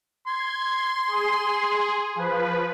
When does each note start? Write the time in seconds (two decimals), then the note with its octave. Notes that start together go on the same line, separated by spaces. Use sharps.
0.27 C6 G#6
1.07 G#4
2.15 F3 B4